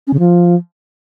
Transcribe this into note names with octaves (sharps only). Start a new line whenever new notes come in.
C#4
C#3
F3